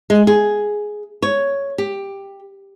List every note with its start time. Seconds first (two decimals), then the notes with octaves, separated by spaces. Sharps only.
0.10 G#3
0.27 G#4
1.22 C#5
1.78 G4